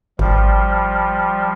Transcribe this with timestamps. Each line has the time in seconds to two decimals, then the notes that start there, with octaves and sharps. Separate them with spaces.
0.19 G#1 F3 G3